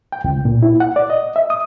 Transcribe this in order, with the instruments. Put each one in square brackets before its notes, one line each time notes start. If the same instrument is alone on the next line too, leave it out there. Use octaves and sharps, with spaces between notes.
[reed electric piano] G5
C#2
A#2
E4
F#5
D5
D#5
E5
D#6